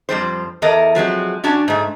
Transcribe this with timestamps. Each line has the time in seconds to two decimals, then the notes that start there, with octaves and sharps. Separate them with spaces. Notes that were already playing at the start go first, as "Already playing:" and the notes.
0.09 F2 F3 G3 C5
0.62 E2 E3 A4 A#4 D#5
0.95 F3 F#3 G#3 C4
1.44 C#4 D4 F#4 A5
1.68 G#2 A3